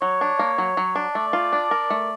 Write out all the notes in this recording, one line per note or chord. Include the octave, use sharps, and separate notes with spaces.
F#3 C#5
D4
A#3
F#3
F#3
D4
A3 D5
F4
D4
A#4
A3